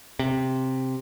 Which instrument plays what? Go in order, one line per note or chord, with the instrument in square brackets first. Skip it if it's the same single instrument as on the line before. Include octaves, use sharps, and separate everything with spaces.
[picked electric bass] C3